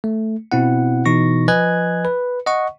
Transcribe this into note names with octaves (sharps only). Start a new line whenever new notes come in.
A3
B2 C4 E4 F#5
B2 E3 D#4 C#6 A#6
F3 B4 D#5 G#5 F#6 G#6
B4
D#5 F#5 C#6